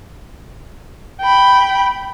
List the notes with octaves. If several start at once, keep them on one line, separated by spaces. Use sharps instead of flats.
G5 B5